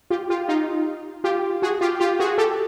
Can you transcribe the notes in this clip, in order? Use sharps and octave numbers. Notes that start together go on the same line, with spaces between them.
F4 G4
F4 G4
D#4 F4
F4 G4
F#4 G#4
F4 G4
F4 G4
F#4 G#4
G4 A4